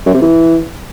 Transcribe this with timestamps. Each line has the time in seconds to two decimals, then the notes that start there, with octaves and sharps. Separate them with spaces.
0.06 F#2
0.14 C3
0.22 E3